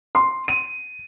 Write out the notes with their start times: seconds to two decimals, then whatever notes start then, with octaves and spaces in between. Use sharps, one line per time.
0.15 C6
0.48 D#7